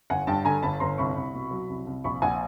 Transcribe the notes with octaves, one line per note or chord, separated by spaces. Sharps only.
G1 F#5 G#5
G2 G5 A5
D3 G#5 A#5
G1 A5 B5
G1 A#5 C6
C2 B5 C#6
C2
B2
F#3
C2
C2
A#1 B5 C#6
A#1 F#5 G#5